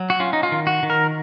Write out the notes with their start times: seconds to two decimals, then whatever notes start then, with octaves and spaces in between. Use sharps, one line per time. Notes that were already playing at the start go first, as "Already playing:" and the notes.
Already playing: F#3
0.10 F#4
0.20 C#4 F4
0.33 D#4
0.43 F4
0.52 D#3
0.67 F#4
0.83 D#3
0.90 A#4